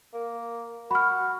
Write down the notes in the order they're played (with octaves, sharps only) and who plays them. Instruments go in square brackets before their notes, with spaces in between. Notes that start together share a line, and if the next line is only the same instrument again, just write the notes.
[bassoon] A#3
[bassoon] F#4 [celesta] B5 F6